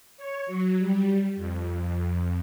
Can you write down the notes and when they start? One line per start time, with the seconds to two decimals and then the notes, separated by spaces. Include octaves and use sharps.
0.17 C#5
0.46 F#3
0.78 G3
1.36 F2